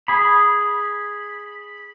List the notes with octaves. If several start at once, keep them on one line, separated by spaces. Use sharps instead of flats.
G#4 B5